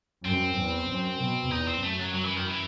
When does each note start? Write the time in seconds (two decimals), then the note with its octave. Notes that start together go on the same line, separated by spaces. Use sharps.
0.25 F#2 C4
0.57 E2
0.88 F#2
1.20 B2
1.51 E2 D#4
1.67 C4
1.82 F#2 A3
1.99 F#3
2.14 F#3
2.25 E3
2.36 D#3
2.46 E3